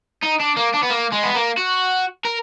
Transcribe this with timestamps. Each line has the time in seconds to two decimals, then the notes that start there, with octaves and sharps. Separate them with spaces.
0.23 D#4
0.41 D4
0.57 A#3
0.74 D4
0.83 B3
0.91 A#3
1.13 G#3
1.24 B3
1.35 A#3
1.57 F#4
2.25 A#4